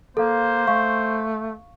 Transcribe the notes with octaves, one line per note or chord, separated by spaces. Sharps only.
A#3 A4 C5 F5
A3 F5 C#6